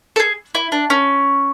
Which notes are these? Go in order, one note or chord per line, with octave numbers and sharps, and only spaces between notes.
A4
G#4
E4
D4
C#4